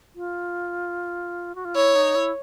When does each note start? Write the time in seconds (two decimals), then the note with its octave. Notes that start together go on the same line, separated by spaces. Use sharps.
0.15 F4
1.55 F#4
1.65 F4
1.75 E4 C#5
1.95 D#4
2.15 E4